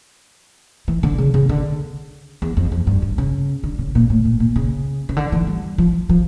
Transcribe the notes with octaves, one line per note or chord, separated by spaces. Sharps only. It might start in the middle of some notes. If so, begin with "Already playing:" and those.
E3
D3
C#3
C#3
D3
E2
F2
F2
G2
G2
C#3
D3
C#3
A#2
A2
A#2
A#2
C#3
C#3
D3
E3
G3
F3
F3